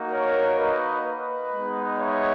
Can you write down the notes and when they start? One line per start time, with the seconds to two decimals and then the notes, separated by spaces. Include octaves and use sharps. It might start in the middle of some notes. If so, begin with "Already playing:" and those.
Already playing: A#3 D#4 F#4
0.11 A#4 C#5
0.58 B4 D#5
1.05 B4 D#5
1.52 G#3 B3 D#4
1.99 C#5 E5